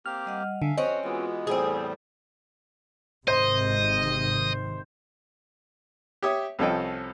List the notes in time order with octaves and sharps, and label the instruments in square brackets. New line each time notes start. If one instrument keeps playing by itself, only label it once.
[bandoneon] A#3 C4 G4 [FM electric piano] F6
[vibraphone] G3 D#5 F#5
[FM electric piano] D3 [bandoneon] E5 F5 [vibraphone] G#5
[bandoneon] F2 F#4 [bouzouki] C4 C#4 [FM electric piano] D#5
[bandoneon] E3 G#3 B3 [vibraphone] F4 F#4
[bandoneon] E2 A2 G3 [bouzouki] C4 G#4 [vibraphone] A4 C5
[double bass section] G#1 C3 D#3 [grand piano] C5 [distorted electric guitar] D#5
[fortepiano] G4 C#5 E5 D#6
C2 F3 C#4 A4 D#5 G5